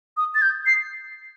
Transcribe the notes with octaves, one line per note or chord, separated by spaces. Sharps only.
D#6
A6
G6
C7